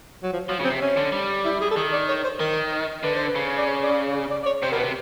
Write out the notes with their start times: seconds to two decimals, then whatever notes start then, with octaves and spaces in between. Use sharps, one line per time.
0.23 F#3
0.33 F3
0.49 F3 F#3
0.60 C#3
0.64 C4
0.71 C3
0.82 C#4
0.97 D3
1.12 G3
1.45 E4
1.61 G#4
1.71 A4
1.76 D#3 G#4
1.92 D5
2.08 C#5
2.24 C5
2.40 D#3 A#4
3.03 D3 B4
3.15 C5
3.27 B4
3.35 C#3
3.58 D5
3.67 C#5
3.83 D5
4.31 D5
4.43 D5
4.46 C#5
4.62 C3 C5
4.72 B2 A#4
4.79 B4
4.84 C3